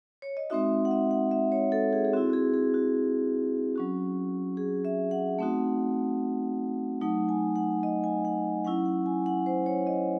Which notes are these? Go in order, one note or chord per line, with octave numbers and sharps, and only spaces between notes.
C#5
D#5
G#3 C4 D#4 F#4 E5
F#5
E5
F#5
E5
C#5
A4
G#4
G#4
C4 E4 F#4
F#4
G#4
G#4
F#4
F#3 C#4 F#4
G#4
E5
F#5
A3 C4 D#4 F#4
F#3 A3 D#4 F#5
G#5
F#5
D#5
G#5
F#5
F#3 C#4 E4 F#5
F#5
G#5
F#5
C5
C#5
D#5